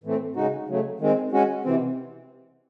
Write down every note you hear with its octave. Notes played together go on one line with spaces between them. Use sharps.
A2 E3 A3 C4
C#3 G#3 D#4 F#4
C#3 F#3 A3
D#3 G#3 C4
G#3 C#4 F#4
C3 E3 C4